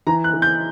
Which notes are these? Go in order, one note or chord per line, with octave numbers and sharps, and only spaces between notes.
E3 A#5
F#6
E3
G6